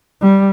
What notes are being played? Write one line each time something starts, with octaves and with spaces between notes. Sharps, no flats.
G3